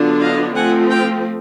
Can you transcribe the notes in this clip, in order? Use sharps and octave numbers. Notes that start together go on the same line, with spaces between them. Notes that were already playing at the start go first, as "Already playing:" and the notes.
Already playing: D3 F#3 B3 D4 F4
D#5 F5
F3 A3 C4 F#5 G#5
F5 G5